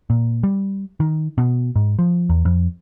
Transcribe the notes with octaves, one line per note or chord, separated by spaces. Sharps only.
A#2
G3
D#3
B2
G#2
F3
E2
F2